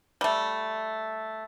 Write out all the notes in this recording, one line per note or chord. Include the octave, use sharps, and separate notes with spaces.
G3 A3